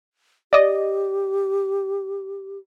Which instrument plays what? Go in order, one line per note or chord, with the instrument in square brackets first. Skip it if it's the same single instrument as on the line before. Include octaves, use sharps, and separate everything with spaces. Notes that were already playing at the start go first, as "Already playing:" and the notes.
[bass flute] G4 [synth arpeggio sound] D5 D#5